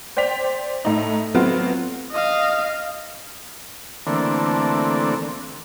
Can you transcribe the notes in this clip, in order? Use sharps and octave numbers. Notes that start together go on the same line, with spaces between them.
C5 D5 G5 B6 F7
A2 D#4
F#3 A3 B3 C4 F4 F#4
D#5 F5
D3 E3 A3 A#3 C4 D4